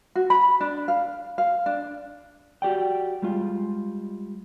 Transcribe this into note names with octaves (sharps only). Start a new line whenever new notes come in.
F#4
B5
D4
F5
F5
D4
F#4 G4 D5 G5
G3 G#3 F4